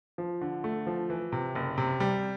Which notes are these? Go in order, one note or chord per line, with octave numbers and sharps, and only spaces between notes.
F3
D3
A3
F3
E3
C3
F#1
C3
G3